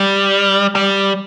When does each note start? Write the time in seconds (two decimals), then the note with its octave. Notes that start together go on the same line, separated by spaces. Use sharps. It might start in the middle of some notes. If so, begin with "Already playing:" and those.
Already playing: G3
0.75 G3